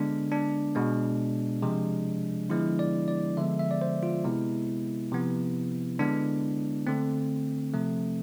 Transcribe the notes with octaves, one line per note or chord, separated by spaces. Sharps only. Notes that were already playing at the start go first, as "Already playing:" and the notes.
Already playing: D3 G#3 B3 D4
D4
B2 G#3 B3
C3 F3 G#3
D3 F3 G#3 B3 E4
D5
D5
D3 F3 G#3 B3 E5
E5
D5
C5
F4
C3 G#3 B3 E4
C3 F3 B3
D3 G#3 B3 D4
D3 A3 C4
C3 F3 A3